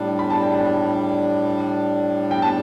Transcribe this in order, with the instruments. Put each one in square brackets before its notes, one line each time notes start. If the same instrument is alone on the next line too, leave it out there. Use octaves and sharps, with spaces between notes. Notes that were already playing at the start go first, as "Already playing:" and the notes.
Already playing: [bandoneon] A2 G3 D4
[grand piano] B5
A5
G5
A5
G5
A5